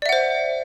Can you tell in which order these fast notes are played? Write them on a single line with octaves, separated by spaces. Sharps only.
D5 E5 F#5 C5